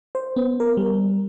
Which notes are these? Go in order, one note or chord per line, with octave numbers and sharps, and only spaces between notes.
C5
B3
A#4
G3